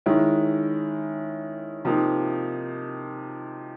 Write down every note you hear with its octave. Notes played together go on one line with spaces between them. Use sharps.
D#3 G#3 C#4 E4
C3 F3 A#3 D#4